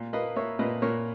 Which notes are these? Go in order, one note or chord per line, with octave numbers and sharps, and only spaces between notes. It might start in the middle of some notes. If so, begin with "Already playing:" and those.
Already playing: A#2
A#3 B4 D#5
A#3 C#5 E5
A#2 B4 D#5
A#2 A#4 C#5